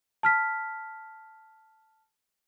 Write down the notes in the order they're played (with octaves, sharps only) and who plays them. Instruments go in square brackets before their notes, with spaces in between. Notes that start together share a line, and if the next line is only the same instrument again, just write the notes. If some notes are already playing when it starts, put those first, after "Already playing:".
[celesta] A5 F6 B6